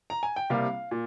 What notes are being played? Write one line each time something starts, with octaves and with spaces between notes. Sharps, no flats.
A#5
G#5
G5
C2 C3 G3 A#3 F5
A#2